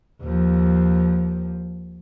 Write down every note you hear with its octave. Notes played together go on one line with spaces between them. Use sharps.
D#2 F3